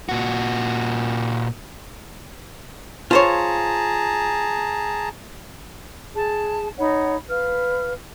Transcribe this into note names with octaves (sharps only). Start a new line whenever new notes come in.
A#2 F#4
F4 G#4 C5 C#5 A5 A#5
G#4 A5
D#4 C#5 F#5 B5
B4 F5 F6